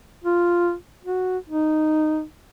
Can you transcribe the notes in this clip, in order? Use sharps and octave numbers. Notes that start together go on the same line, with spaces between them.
F4
F#4
D#4